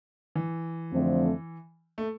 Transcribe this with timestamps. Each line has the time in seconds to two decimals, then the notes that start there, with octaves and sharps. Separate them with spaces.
0.35 E3
0.92 F2 D3 F3 A3 C4
1.98 A3